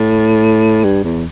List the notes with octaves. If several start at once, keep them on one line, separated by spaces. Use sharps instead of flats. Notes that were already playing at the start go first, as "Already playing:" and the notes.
Already playing: A2
G2
E2